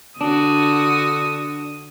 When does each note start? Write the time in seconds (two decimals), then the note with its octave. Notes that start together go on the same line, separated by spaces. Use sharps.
0.21 D3 D4 F#4 D#6